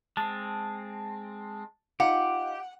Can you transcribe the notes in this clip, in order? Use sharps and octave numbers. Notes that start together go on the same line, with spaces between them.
G#3 C4 A5
D#4 F4 G4 F#5